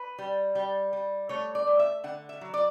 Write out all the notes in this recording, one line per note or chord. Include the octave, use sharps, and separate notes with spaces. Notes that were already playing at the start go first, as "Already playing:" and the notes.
Already playing: B4
G3
G3
G3
A3 C#5
D5
A3
E5
D3 F#5
E5
F#3
D5